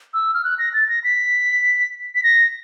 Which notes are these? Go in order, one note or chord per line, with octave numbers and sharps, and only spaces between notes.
E6
F6
F#6
A#6
A6
A#6
B6
B6
A#6